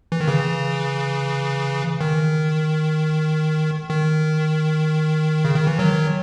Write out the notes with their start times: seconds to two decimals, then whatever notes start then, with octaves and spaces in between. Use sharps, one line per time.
0.12 E3
0.20 D#3
0.28 C#3 E3
2.01 D#3
3.90 D#3
5.45 C#3
5.56 D#3
5.67 E3
5.79 D#3 F#3